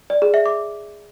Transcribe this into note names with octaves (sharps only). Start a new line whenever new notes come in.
D5
G#4
E5
D6